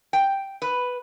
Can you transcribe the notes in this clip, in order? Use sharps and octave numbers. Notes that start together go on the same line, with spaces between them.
G5
B4